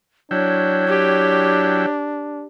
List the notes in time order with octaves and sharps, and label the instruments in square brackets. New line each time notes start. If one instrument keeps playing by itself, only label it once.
[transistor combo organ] F#3 E4 G5 [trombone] D4 [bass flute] C#5
[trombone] D4 [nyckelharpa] G4